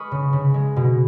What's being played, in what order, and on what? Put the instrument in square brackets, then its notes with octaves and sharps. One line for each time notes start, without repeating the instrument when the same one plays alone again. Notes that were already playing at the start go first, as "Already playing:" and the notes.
Already playing: [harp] G#3 B4 B5 C#6 D#6 F6
C#3
C#3
G#3
B2